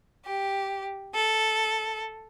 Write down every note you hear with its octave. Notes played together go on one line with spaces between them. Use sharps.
G4
A4